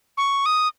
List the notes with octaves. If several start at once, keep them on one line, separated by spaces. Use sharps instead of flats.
C#6
D#6